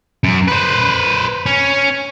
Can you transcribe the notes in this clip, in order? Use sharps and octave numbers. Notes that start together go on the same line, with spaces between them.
F#2
B4 C5
C#4